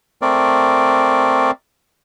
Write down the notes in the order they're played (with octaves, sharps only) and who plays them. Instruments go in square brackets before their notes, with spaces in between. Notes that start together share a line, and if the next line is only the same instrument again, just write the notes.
[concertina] A3 C4 A#4 D5